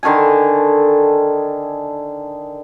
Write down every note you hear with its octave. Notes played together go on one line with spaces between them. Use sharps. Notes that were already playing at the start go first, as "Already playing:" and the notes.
D3 D#3 A4 G#5